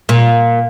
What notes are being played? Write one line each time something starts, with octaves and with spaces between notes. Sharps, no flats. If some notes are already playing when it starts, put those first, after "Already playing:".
A#2